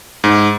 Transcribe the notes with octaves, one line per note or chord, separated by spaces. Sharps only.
G#2